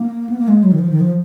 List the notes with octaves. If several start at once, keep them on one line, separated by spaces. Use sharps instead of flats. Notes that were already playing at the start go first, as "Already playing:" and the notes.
Already playing: A#3
B3
A#3
G#3
F#3
D#3
F3
D#3
F3